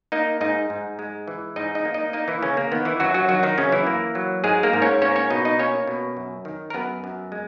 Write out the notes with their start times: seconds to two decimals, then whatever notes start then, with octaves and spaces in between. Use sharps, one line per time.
0.12 A#3 D#4 D#5
0.41 G#2 D#4 D#5
0.70 G#2
0.99 G#3
1.28 E3
1.56 G#2 D#4 D#5
1.75 D#4 D#5
1.85 A#3
1.94 D#4 D#5
2.13 A#3 D#4 D#5
2.28 E3 E4
2.42 C#3 A#3 C#4
2.57 A#3
2.72 D#3 B3
2.85 E3 E4
3.00 F#2 F#3 F#4
3.14 F#3 F#4
3.29 D#3 F#3 F#4
3.43 D#3 D#4
3.58 F#2 C#3 C#4
3.72 E3 E4
3.87 A#3
4.15 F#3
4.44 G#2 G#3 G#4
4.63 A#3 A#4
4.73 G#2
4.82 C#4 C#5
5.02 A#3 C#4 C#5
5.16 C#4 C#5
5.30 B2 D#4 D#5
5.45 D#4 D#5
5.59 A#3 C#4 C#5
5.87 B2
6.17 F#2
6.45 D#3
6.70 A#4
6.74 F#2 B3 B4
7.04 F#2
7.32 G#3